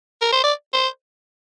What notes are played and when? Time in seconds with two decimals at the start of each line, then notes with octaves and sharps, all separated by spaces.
0.21 A#4
0.32 C5
0.44 D5
0.73 C5